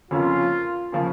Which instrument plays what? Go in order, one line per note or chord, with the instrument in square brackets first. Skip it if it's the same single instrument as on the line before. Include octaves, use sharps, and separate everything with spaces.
[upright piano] F2 C#3 F3 A#3 C#4 [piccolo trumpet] F4
[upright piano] C#3 F3 A#3 C#4